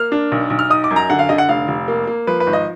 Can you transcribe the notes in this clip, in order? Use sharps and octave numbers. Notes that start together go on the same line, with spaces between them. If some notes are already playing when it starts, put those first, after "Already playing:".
Already playing: A#3 F6
D4
B1
B1
F6
D#4 D#6
D6
F#2
A#5
D3 F#5
F5
D3 D#5
F#5
F1 F5
F1
A#3
A#3
F3 B4
B4
G#1
D#5